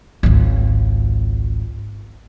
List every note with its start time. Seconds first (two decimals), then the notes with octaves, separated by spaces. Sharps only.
0.23 G#1 C#2